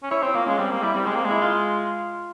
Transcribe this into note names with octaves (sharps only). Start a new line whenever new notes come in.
C#4
E4 C#5
C4 C5
A#3 F4
G#3 C#4
G3 C4
A#3
G3 E4
G3 C4
G#3 C4
A#3
G#3
E4
F4